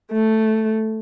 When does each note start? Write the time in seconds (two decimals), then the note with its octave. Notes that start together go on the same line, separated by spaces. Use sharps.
0.13 A3